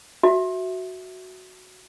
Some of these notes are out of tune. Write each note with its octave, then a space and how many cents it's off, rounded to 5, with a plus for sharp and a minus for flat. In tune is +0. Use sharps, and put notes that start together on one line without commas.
F#4 +0 E5 +0